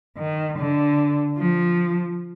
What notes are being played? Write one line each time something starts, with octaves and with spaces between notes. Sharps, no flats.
D#3
D3
F3